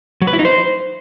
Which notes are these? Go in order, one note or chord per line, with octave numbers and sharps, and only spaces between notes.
F#3
B4
E4
D#4
C5